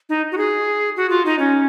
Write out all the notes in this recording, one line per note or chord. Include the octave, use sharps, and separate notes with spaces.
D#4
F#4
G#4
F#4
F4
D#4
C#4